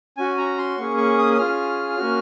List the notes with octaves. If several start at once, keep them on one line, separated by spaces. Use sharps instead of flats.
C#4 F#4 G#5
A#5
C6
A#3 C#4 G#4 C#6
C#6
D#6
D#6
C#4 F4 G#4 F6
A#3 C#4 F#4